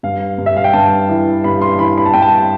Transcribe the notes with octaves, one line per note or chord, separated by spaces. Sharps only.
G2 F5
G2
E5
F5
G5
G2 A5
E3
G2 B5
C6
E3 B5
B5
A5
G2 G5
A5